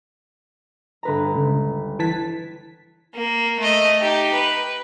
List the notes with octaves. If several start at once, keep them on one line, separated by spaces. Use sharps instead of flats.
G1 B4 A#5
C#2
E3 A5 F#6 G#6 B6
A#3
A3 D#5
D#4 G4
B4